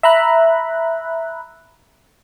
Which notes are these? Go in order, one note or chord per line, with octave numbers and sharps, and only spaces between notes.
E5 A#5 B5 F#6